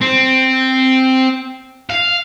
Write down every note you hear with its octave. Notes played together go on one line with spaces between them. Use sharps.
C4
F5